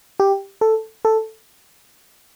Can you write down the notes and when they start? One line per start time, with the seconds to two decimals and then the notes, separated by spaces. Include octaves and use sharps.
0.20 G4
0.61 A4
1.05 A4